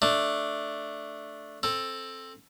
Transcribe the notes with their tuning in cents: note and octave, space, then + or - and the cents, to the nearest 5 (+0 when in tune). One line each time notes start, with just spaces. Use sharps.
A3 +0 D4 +0
C4 +15 A4 +0